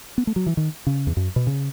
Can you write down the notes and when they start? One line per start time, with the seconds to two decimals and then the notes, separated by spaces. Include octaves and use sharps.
0.18 B3
0.27 A3
0.36 F#3
0.46 E3
0.57 D#3
0.87 C#3
1.07 E2
1.17 F#2
1.36 B2
1.47 C#3